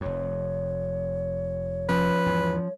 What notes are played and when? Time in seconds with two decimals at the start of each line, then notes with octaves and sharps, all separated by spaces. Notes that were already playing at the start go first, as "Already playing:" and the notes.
0.01 F1 F2 C#5
1.89 F3 C#4 B4
2.26 E2 G#2 E3